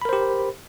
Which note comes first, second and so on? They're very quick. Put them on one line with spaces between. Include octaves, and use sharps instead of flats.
B5 A#4 C5 G4